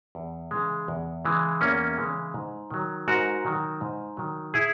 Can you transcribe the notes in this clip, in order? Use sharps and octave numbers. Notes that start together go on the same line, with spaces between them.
E2
C#3 E3 G#3
E2
C#3 E3 G#3
E2 A#3 C#4
C#3 E3 G#3
G#2
D#3 F#3
G#2 F#4 A#4
D#3 F#3
G#2
D#3 F#3
E4 G#4